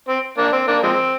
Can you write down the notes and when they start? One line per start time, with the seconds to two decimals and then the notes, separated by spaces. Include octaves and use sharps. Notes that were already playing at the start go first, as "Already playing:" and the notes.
0.08 C4
0.38 A#3 D4
0.52 C4
0.67 A#3 D4
0.83 F3 G#3 C4